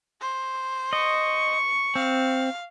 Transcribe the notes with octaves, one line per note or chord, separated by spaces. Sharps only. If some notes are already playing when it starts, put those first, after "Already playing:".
C5
D#5 C#6
C4 F5